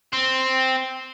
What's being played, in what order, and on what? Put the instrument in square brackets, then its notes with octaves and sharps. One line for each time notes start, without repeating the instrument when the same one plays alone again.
[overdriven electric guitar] C4